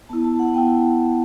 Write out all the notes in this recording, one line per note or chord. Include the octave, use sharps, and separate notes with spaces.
B3 E4 A5
A5
F#5
B3 E4 G5